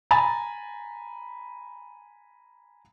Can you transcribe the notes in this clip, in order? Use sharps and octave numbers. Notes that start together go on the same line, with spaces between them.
G#5 A#5 B5 A6